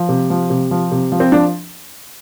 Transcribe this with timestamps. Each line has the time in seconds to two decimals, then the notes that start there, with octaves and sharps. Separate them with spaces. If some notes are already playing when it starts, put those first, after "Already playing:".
Already playing: F3
0.09 C3
0.30 F3
0.50 C3
0.71 F3
0.91 C3
1.12 F3
1.20 C4
1.32 F3 D4